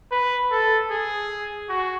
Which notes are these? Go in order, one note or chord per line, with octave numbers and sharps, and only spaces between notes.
B4
A4
G#4
F#4